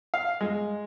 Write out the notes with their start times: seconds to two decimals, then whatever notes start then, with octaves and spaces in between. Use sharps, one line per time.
0.14 F5
0.41 G#3